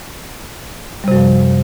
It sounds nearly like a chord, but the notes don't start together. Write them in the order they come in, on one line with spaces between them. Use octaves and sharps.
G3 C3 F#2 F3